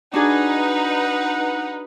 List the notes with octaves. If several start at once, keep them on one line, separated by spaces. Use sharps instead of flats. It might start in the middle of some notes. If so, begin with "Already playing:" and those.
D4 D#4 F#4 G#4 B4 F#5